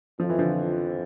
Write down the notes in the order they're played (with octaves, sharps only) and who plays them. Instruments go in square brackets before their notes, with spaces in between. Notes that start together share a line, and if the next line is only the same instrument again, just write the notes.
[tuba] F2 [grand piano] F3
[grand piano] E3
D3 F3